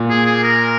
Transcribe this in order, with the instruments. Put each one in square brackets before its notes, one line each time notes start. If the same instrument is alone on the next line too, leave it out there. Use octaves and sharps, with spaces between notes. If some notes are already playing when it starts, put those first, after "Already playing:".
Already playing: [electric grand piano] A#2
[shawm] G#4
G#4
A#4